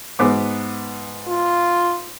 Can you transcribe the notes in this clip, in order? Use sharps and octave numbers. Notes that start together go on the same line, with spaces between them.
G#2 B3 D6
F4